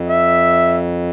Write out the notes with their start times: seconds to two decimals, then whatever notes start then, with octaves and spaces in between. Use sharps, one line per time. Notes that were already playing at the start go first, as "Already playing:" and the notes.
Already playing: F2
0.08 E5